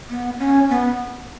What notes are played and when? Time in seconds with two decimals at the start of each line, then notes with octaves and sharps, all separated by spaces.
0.09 B3
0.39 C#4
0.69 B3